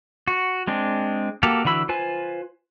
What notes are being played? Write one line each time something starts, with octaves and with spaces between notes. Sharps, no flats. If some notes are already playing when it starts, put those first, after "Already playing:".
F#4
G#3 C4 D4
A#3 F#4 G4 A4 F5
D3 E3 F#4 B5 E6
F4 B4 C5 G#5